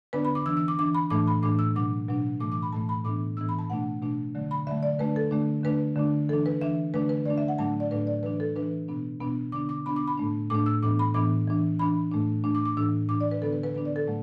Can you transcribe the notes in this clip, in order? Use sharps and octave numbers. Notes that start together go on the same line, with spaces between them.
D3 B3 D4 B4
B5
D6
E3 D4 E6
E6
D6
E3 D4 D6
B5
A2 E3 A3 D4 D6
B5
A2 E3 A3 D4 D6
E6
B2 F#3 D4 D6
B2 F#3 D4
A2 E3 A3 D6
D6
B5
A2 E3 A3 A5
B5
A2 E3 B3 D4 D6
A2 E3 B3 D4 E6
B5
A5
B2 A3 D4 F#5
B2 A3 D4
D3 F#3 A3
B5
D3 F#3 A3 E5
D5
D3 A3 D4 B4
A4
D3 A3 D4
D3 A3 D4 B4
D3 A3 D4
E3 D4 A4
B4
E3 D4 E5
D3 A3 D4 B4
B4
D3 A3 D4 D5
E5
F#5
A2 F#3 A3 D4 A5
D5
A2 F#3 A3 D4 B4
D5
E3 D4 B4
A4
E3 D4 B4
B2 B3 D4
B2 B3 D4
D3 B3 D4 D6
D6
D3 B3 D4 B5
D6
B5
A2 A3 D4
A2 A3 D4 D6
E6
A2 E3 B3 D4 D6
B5
A2 E3 B3 D4 D6
E3 D4
E3 D4 B5
A2 A3 D4
A2 A3 D4
D6
D6
A2 E3 D4 E6
A2 E3 D4 D6
D5
B4
D3 B3 D4 A4
B4
B4
D3 B3 D4 B4
D5
A4
A2 F#3 A3